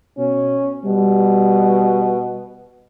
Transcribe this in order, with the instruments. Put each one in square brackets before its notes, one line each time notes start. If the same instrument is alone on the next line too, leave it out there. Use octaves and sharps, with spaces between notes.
[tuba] B2 [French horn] C#4
[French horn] B2 [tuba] G3